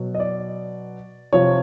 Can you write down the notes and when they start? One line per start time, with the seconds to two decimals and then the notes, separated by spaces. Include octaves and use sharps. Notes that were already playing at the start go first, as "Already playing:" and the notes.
Already playing: B2 F#3
0.15 D#5
0.20 D5
1.32 C3 F3 C#5